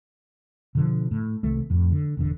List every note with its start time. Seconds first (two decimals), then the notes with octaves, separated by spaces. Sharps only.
0.75 B2 D3 F3
1.11 A2
1.43 C2 D#3 A3
1.70 F2 A2
1.92 D3
2.17 E1 A1 D3